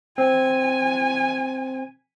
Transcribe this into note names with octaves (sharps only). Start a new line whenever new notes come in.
C4 G#5